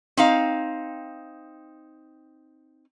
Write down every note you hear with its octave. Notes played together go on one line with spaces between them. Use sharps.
C4 D#4 F5